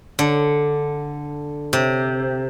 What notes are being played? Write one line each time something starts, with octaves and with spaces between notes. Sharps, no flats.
D3
C3